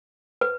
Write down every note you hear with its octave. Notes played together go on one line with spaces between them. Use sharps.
B4